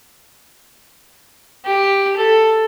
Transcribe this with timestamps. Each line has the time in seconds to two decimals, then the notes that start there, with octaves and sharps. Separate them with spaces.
1.66 G4
2.17 A4